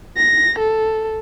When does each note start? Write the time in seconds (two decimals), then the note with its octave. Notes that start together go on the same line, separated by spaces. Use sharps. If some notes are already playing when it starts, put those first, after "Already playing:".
0.17 A#6
0.58 A4